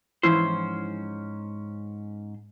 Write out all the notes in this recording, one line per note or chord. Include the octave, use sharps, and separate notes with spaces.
G#2 E3 F3 C#4 E4 C5